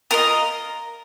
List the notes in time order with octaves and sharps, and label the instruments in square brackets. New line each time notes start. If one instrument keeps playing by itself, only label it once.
[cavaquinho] F4 A#4 D#5 A#5